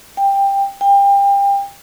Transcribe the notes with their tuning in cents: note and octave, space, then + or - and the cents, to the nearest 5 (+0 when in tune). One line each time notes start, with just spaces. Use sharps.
G5 +15
G5 +30